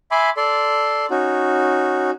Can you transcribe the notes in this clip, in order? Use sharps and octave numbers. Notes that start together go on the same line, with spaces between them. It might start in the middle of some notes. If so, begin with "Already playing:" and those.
E5 G#5 B5 C6 D6
A4 D5 C6
C#4 D#4 F#4